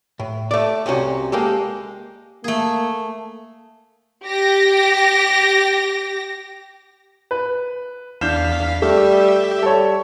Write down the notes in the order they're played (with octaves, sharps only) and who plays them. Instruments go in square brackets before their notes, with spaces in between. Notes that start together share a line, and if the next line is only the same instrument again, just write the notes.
[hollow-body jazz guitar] A2
A3 D5
C2 C3 C#4 F#4
G#3 A#3 G4 A4
[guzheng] A3 G#4 [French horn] A#3
[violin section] G4 A#6
[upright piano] B4
[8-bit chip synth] E2 F5 B6 [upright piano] D4 G6 E7
[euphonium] G3 [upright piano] A3 [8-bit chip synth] G4 E5
[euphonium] G3 [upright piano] A4 C#5